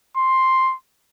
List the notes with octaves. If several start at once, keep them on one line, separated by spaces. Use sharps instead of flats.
C6